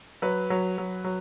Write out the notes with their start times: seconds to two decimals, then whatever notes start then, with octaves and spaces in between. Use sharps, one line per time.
0.22 F#3 B4
0.50 F#3
0.78 F#3
1.04 F#3